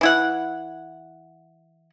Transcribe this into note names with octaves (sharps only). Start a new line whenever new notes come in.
E3 E4 F#5